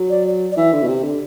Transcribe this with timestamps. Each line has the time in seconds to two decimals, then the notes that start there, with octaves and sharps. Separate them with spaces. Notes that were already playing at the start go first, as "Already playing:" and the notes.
Already playing: F#3
0.10 D5
0.52 D5
0.56 E3 E5
0.72 D3
0.83 B2
0.88 C3
1.03 D3